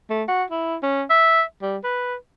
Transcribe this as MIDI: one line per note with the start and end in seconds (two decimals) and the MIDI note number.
0.10 0.23 57
0.28 0.43 66
0.50 0.77 64
0.83 1.04 61
1.10 1.43 76
1.62 1.77 55
1.84 2.15 71